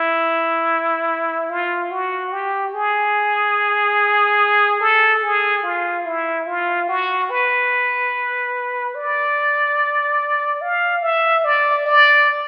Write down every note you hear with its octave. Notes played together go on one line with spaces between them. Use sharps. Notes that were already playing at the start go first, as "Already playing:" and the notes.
Already playing: E4
F4
F#4
G4
G#4
A4
G#4
F4
E4
F4
F#4
B4
D5
F5
E5
D5
D5